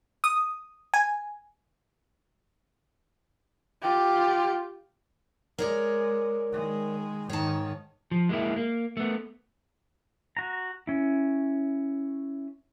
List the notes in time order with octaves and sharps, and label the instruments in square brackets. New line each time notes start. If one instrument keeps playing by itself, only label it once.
[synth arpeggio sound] D#6
G#5
[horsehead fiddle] F4 G4
[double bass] G#3 [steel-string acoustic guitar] A#4 C#5 D5
[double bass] D#3 G#3
[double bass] G#2 D#3 [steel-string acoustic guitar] C#5 A5
[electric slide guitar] F3
G#3 A#3 E4
A#3
A3 B3
[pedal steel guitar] F#4 A#5
C#4 E4